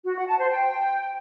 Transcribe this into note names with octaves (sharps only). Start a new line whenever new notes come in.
F#4
F#5
A5
C5
G5